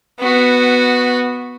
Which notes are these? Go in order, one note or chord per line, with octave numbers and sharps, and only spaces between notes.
B3 F#4